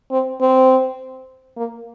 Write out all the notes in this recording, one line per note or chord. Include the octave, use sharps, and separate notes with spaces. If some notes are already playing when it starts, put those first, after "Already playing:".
C4
C4
A#3